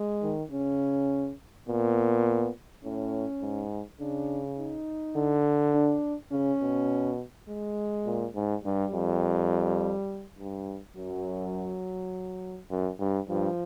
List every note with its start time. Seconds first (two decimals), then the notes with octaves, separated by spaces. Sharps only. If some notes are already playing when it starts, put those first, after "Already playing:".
Already playing: G#3
0.23 D#3
0.51 C#3 C#4
1.68 A#2 B3
2.84 A2 C#4
3.42 G#2
4.01 C#3 D4
4.58 D#4
5.16 D3
5.74 D4
6.32 C#3 C#4
6.62 B2
7.49 G#3
8.06 A#2
8.35 G#2
8.65 G2 G3
8.93 F2
10.39 G2
10.96 F#2 F#3
12.71 F#2
12.99 G2
13.28 G2 F3